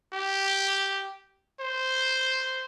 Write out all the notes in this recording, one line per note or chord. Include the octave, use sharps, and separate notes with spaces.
G4
C5